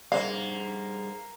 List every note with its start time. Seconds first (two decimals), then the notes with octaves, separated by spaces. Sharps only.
0.12 G3 A#3 G#4 C5 F5